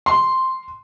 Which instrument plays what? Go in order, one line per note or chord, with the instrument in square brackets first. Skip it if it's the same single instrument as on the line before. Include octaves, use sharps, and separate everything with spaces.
[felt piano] C6